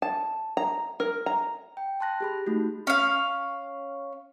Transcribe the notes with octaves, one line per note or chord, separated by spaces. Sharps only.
A5
A#5
A#4
A#5
G5
A5 C6 F#6 A#6
G4 G#4 B5
A3 D#4 F#4
C#4 F5